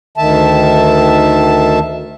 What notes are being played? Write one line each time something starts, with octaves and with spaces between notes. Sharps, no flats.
D2 D#3 E5 A5